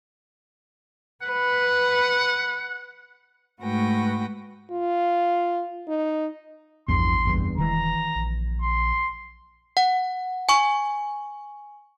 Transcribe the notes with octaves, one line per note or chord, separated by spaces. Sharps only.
B4 F#5
G#2 A3 F#4 B4 G5 A#6
F4
D#4
A1 E2 G2 F3 C6
F#1 E2 G2
E1 D#3 E3 G#3 A#5
A#1
C6
F#5
G#5 C#6